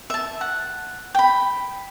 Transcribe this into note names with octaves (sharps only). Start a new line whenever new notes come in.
E5 A5
F#5
G5 B5